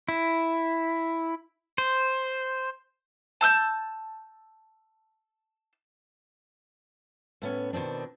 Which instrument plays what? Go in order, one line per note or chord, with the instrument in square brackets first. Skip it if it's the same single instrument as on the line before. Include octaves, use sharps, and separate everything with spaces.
[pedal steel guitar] E4
C5
[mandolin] A5 E6 G6
[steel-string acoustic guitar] A2 B3 C#4
B2 D#3 C4 D4